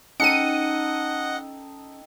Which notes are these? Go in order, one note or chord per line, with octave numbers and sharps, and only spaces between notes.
C#4 D#4 A4 D#5 F#5 G5 C#7 D#7